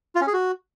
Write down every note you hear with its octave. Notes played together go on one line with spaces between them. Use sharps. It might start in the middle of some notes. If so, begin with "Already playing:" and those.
F4
C#4
G#4
F#4